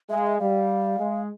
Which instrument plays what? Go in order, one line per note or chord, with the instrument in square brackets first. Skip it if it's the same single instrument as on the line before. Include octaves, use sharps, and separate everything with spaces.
[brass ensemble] G#3 [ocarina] E5
[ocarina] F5
E5
[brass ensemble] G3 [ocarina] F5
[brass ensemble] G#3